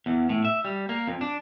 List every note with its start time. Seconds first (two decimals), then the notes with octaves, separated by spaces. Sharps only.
0.06 E2
0.29 A2
0.45 E5
0.65 G3
0.89 A#3
1.07 F2
1.21 D4